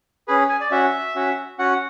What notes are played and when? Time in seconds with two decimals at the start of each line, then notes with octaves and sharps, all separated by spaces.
0.28 C#4 G#4 B4
0.49 G#5
0.61 D5
0.71 C#4 F#4 E5
1.15 C#4 F#4
1.58 C#4 F#4 F#5